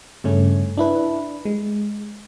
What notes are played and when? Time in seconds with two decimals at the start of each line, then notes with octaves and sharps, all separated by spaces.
0.24 G2 C#3 A3 C#4
0.78 D4 E4 B4
1.45 G#3